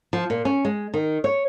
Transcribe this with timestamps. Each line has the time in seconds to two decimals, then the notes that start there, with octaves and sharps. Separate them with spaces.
0.13 F3
0.30 A#2
0.45 C#4
0.65 G#3
0.94 D#3
1.24 C#5